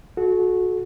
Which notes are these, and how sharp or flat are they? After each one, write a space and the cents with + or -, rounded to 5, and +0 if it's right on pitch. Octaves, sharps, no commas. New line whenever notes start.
F#4 -15 A4 -35